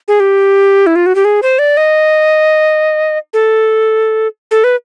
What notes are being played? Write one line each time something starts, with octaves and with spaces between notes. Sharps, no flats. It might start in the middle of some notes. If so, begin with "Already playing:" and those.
G#4
G4
E4
F4
F#4
G4
G#4
C5
D5
D#5
A4
A4
B4